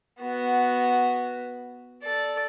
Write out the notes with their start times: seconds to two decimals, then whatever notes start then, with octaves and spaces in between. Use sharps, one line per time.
0.20 B3 F#4
2.03 A4 D5